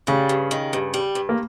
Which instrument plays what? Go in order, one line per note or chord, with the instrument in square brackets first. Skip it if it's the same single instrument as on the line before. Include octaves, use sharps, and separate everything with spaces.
[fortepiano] C#3 [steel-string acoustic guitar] G3
[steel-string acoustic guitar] G2
D#3
G2
G3
G2
[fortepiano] A#3